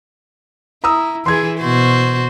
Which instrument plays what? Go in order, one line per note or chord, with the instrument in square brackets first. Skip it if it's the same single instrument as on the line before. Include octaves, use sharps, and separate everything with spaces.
[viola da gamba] E4 [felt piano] A#5 D#6 E6
[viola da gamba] E3 E4 G#4 [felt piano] C6 G#6
[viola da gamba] B2 F#4 C5